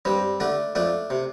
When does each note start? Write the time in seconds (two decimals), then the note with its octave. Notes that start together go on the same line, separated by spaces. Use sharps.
0.05 G2 G3 C4
0.40 D3 A3 D4
0.75 F2 A3 D4
1.10 C3